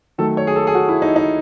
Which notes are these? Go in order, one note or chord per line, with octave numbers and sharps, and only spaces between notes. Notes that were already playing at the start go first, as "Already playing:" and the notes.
D#3 F#3 A3 A4
C#5
G#4
A4
G#4
F#4
E4
D#4
D#4